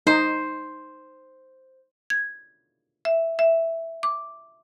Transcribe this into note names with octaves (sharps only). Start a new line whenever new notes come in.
D#4 C5
G#6
E5
E5
D6